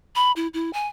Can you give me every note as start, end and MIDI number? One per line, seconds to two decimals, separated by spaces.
0.15 0.32 83
0.36 0.47 64
0.54 0.71 64
0.73 0.87 80